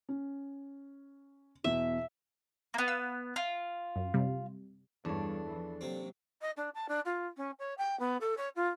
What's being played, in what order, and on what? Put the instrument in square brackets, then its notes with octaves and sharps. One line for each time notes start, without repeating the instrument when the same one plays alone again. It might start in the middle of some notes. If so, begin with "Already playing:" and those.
[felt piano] C#4
[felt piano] E2 B2 [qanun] E5
[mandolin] A#3 B3
[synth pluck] F5 E6
[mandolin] F4
[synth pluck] F#2
C3 G3
[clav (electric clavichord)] E2 C#5 [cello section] G2 [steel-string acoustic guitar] D4 A4
[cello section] E3 F3
[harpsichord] C3 C4 [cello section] F#3 A#3
[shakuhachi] D#5
D4
A5
D4
F4
C#4
C#5
G5
B3
A4
C#5
F4